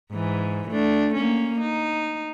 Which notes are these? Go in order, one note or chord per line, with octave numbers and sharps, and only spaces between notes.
G#2 E3
A3 D4
A#3 C#4
D#4